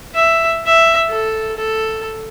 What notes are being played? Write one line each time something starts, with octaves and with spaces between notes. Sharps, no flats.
E5
E5
A4
A4